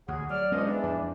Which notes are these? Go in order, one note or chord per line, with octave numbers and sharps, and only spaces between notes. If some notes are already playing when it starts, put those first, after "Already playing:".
D2 F#4 G#4
F#3 D5 F6
C#2 F3 G#3 B3 C#4 D#5
E2 D4
F2